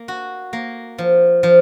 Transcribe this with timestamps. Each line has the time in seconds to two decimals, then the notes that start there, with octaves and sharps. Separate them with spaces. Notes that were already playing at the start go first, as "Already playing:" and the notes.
Already playing: A#3
0.08 F#4
0.53 A#3
0.98 F3
1.43 F3